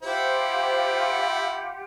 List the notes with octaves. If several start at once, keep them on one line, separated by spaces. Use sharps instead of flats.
E4 F4 G4 C5 F#5